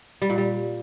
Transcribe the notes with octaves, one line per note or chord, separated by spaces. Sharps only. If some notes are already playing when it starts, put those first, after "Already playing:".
G3
A#2
G3